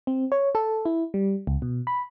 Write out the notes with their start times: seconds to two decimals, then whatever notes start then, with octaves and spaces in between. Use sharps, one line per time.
0.07 C4
0.32 C#5
0.55 A4
0.85 E4
1.14 G3
1.47 C#2
1.62 B2
1.87 B5